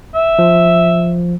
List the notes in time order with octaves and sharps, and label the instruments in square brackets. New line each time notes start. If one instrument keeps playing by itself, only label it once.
[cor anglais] E5
[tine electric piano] F3